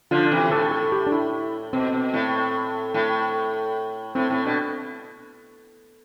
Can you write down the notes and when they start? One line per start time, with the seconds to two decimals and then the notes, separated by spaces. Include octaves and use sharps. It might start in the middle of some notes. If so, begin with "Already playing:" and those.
0.11 D3 F3 F4
0.31 C3 E3
0.51 A2 A4
0.72 A4
0.92 G4
1.07 D4
1.12 E4
1.73 B2 C4
1.93 B2
2.14 A2
2.94 A2
4.15 A2 C4
4.30 A2
4.45 B2 D4